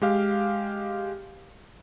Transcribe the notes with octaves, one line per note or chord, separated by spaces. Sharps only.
G#3 G4 F5